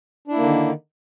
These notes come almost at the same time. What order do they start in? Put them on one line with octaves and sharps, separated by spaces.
D4 E4 A#3 D3 D#3